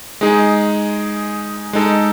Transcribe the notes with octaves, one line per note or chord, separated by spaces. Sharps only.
G#3 D#4 G#4
G#3 D#4 A4